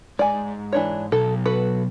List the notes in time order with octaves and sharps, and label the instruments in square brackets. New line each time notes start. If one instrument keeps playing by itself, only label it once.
[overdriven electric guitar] G#2 [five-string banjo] D5 G#5
[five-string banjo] E3 D4 C#5
[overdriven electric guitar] B1 [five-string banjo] A4
[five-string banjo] F#4 A4 B4